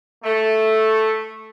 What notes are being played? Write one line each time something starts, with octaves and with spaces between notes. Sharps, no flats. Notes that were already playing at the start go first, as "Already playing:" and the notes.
A3